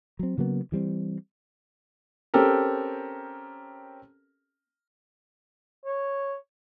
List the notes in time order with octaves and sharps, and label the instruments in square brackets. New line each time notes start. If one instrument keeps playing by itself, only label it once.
[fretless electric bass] F#3 C4
C#3 F#3 A#3 B3
E3 G3 C4
[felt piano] C4 C#4 G4 A4 A#4
[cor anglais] C#5